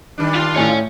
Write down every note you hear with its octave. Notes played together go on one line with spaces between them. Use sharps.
D#3 G3 D4
F4 F5
A2 A3 C#5 G#5